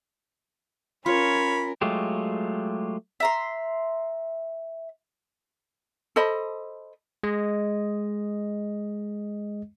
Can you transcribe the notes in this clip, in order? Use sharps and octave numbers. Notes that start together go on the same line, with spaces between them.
C#4 F4 A#4 C#5 B5
F#3 G#3 A3 F4 G4
E5 A#5 C6
A4 C5 D#5 B5
G#3 D#5